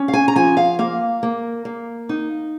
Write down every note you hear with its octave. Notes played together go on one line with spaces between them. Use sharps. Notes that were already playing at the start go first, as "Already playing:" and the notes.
Already playing: C#4
F5
G#5
A#5
F3 G#5
F5
A#3 F5
A#3
A#3
D#4